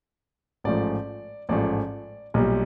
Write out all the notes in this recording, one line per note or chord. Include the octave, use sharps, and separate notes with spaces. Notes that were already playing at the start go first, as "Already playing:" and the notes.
A1 G#2 F3 A3 D5
A1 G#2 F3 A3 D5
B1 A#2 G3